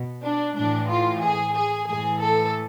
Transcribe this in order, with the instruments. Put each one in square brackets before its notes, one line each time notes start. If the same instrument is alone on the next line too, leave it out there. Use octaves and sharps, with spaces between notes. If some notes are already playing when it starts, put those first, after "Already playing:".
Already playing: [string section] B2
D4
A2 E3 D4
F4
G#4
G#4
A2 E3 G#4
A4